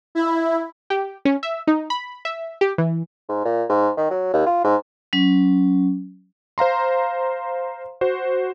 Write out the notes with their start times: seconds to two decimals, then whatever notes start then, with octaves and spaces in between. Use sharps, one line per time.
0.15 E4
0.90 G4
1.25 C#4
1.43 E5
1.67 D#4
1.90 B5
2.25 E5
2.61 G4
2.78 E3
3.29 G#2
3.45 A#2
3.69 G#2
3.97 D#3
4.10 F#3
4.33 D#2
4.46 F4
4.64 G#2
5.13 F#3 C#4
6.58 C5 F5 A#5 C6
8.01 F#4 C5